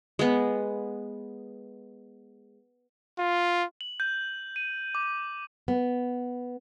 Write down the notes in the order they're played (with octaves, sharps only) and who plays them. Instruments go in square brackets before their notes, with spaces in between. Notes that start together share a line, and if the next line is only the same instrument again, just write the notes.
[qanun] G#3 B3
[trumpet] F4
[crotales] F#7
G6
D#7
D6
[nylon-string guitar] B3